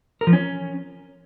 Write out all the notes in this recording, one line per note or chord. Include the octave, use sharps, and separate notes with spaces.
A#4
F3
C#4